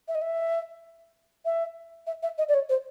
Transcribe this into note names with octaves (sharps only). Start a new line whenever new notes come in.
E5
D#5
E5
E5
E5
E5
D#5
D5
C#5
C5